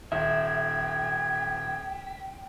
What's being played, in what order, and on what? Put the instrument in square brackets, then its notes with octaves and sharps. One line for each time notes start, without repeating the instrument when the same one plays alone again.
[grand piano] D#1 [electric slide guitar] E5 [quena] G5 [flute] G#6